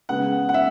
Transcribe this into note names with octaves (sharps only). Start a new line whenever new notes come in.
C#3 G#3 B3 F#5
F#5
E5